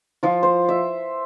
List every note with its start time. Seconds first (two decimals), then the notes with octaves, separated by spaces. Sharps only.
0.23 F3 F4
0.43 C5
0.69 E5